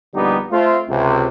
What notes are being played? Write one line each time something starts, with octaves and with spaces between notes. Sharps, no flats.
A#1 D3 G3 B3 D#4 G4
A3 C4 F4
C#2 C3